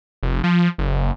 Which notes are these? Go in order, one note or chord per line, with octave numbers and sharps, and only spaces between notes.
F1
F3
F#1